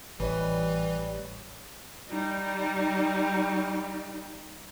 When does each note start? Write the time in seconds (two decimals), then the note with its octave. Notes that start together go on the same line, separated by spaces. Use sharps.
0.20 A1 E3 G3 B4 C#5 D#5
2.09 G3 D#4